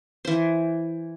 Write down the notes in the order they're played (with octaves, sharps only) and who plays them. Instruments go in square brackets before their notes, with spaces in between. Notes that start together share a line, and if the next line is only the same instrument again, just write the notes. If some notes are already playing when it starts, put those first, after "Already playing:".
[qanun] E3 C5